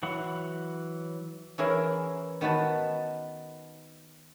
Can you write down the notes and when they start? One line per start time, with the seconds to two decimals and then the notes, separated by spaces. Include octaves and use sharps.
0.03 E3 F#3 F#5 B5
1.58 E3 C#4 E4 G#4 A#4
2.41 D#3 B3 F#4 B4 A5